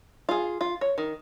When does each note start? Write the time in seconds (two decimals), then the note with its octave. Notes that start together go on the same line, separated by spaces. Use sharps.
0.29 F4 G#4
0.61 F4
0.81 C#5
0.98 D#3